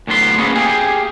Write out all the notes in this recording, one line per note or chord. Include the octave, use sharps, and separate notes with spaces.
D2 A2 F#3 B3 C6
A#3 B3 C#4 D#4 G#4 B4
G4 G#4 F5 G#5